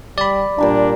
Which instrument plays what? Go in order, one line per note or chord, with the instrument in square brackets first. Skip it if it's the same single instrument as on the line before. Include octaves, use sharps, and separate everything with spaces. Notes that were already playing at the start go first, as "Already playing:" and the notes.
[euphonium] G3 [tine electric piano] D5 B5
[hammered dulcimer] A#2 G3 A#5 [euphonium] D4